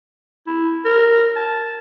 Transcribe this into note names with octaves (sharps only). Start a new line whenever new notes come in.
E4
A#4
A5